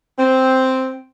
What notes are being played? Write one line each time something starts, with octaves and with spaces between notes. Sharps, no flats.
C4